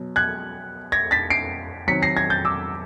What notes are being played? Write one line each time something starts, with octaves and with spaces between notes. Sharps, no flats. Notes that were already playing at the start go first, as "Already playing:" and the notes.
Already playing: B2 F#3
F#6 G#6
G#6 A#6
A6 B6
C7 D7
C3 D#3 F#3 B6 C#7
A#6 C7
G#6 A#6
G6 A6
D6 E6